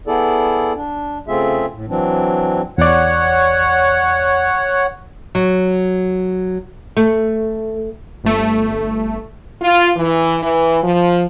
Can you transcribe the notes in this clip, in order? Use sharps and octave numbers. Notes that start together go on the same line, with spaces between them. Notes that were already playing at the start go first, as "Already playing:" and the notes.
B3 E4 G#4 A4 D5
D4
C#3 A3 C4 F4 G#4 E5
A2
E3 F#3 C4 D4
E2 C#5 D5 F#5
F#3
A3
G1 A3
F4
E3
E3
F3